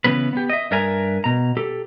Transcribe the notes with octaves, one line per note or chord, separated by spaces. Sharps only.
C#3 E3 B3 B4
B3 G4
D#5 E5
G2 D4 A#4 E5 G#5 A#5
B2 A#5
G4 A4